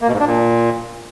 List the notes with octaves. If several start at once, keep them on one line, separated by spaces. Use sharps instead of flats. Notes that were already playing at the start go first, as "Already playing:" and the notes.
A#3
B2
G#2
D4
A#2